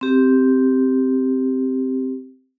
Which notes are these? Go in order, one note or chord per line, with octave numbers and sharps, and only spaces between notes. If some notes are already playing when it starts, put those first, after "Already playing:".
C4 G4